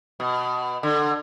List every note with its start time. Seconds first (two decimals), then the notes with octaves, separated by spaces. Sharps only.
0.20 B2
0.83 D3